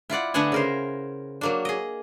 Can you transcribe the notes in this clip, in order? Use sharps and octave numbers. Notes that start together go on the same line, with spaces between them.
E4 F4 D5 F#5
D3 A3 B3 D4 F#5 G#5
C#3 A#4 C5
F#3 A#3 D4
G#4 D#5